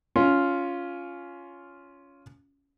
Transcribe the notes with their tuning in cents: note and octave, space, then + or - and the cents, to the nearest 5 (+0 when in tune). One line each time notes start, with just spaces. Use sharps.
C#4 +15 F4 +0